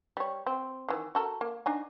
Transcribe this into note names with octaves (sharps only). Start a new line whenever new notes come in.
G3 C#5
C4
D#3 E3
F#4 A4 A#4
A#3
D4 D#4 G#5